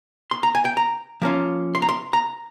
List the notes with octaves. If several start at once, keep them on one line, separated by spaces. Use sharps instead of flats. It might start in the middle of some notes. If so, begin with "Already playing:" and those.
C6
A#5
G#5
G5
A#5
F3 A#3 C#4 F4
C6
A#5
C6
A#5